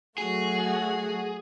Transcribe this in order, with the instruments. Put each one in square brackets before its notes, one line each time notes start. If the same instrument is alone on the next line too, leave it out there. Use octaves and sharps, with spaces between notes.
[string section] F#3 A3 F#4 [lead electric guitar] G#4